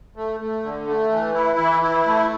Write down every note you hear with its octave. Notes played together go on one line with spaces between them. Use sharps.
A3
A3
D3
A3
E3
E4
E3
E4
A3